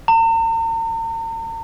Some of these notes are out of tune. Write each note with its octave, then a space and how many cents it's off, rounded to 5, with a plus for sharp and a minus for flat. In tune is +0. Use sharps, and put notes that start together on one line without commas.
A#5 -45